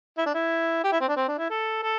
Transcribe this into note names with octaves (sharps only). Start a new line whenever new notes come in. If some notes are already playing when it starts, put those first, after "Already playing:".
E4
D4
E4
G4
E4
C4
D4
C4
D4
E4
A4
A4